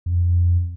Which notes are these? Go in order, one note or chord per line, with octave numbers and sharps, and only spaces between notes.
F2